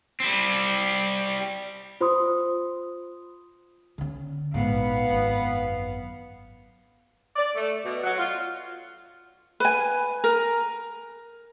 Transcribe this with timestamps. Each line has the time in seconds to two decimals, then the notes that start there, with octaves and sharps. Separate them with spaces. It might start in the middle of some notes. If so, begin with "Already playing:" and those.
0.20 G3 C4
2.01 F4 C5 B5 C6 D#6
3.98 D3 C#4
4.54 A#1 G#2 B3 F5
5.10 G#1 F#2
7.36 D5
7.56 A3
7.85 B2
8.04 F#3
8.18 F4
9.60 B4 G#5
10.24 A#4